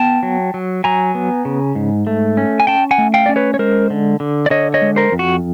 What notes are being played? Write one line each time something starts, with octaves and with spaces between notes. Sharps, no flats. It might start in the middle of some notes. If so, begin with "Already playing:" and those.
Already playing: B3 G5 A5
F#3
F#3
F#3 G#5 A#5
B3
C#3
G#2
A3
C#4
G#5
C#4 G5 A5
F#5 G#5
A3
F5 G5
C#4 D5
B4 C#5
C#5
G#3 A#4 C5
D3
D3
D5
D3 C#5 D#5
C#5 D#5
G#3
A#4 C5
F2
F#4